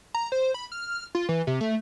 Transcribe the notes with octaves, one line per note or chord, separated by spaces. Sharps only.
A#5
C5
B5
F6
F4
E3
C3
A3